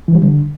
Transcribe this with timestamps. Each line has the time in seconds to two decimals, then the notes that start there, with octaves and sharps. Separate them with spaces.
0.08 E3
0.15 G3
0.22 D3